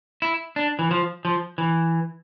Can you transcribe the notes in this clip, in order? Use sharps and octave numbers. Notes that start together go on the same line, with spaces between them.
E4
D4
E3
F3
F3
E3